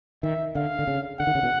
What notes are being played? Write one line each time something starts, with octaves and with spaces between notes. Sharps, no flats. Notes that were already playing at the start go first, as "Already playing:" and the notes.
D#3 E5
D3 F5
D3
C#3
D3 F#5
D#3
C#3
B2